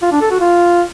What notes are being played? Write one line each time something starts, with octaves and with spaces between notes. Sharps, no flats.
F4
D4
A4
F#4
F4